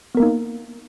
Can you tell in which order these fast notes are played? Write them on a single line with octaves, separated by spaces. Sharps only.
B3 A#4 A#3 D#4